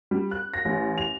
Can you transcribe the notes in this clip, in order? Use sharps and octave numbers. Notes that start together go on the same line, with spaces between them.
G3
F#6
A#6
A1
F7